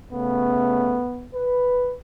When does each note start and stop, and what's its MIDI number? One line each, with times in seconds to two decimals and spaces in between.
0.13 1.02 49
0.13 1.02 57
0.13 1.29 59
1.34 1.94 71